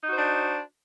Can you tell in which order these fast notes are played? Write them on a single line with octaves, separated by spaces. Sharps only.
D#4 F#4 C5 D4